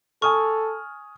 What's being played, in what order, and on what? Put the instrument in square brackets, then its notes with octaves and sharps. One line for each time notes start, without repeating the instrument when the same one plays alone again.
[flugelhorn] A4 [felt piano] G#5 D#6 F6 [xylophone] C#6